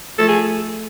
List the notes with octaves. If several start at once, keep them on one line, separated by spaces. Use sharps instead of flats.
F3 A3 A4
G#4